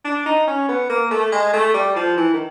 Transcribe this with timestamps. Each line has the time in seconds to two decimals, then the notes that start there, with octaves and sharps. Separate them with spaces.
0.05 D4
0.26 D#4
0.47 C#4
0.69 B3
0.89 A#3
1.11 A3
1.32 G#3
1.53 A3
1.74 G3
1.96 F3
2.17 E3
2.34 D#3